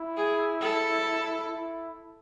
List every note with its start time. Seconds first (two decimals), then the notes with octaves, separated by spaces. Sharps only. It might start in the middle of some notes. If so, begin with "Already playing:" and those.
Already playing: E4
0.17 G#4
0.61 A4
1.49 E4